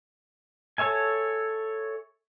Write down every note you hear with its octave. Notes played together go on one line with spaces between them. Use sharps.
A4 C#5 E5 G#5